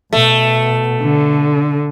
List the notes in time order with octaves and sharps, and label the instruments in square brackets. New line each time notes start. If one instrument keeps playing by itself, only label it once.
[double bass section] B2 [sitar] A3
[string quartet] D3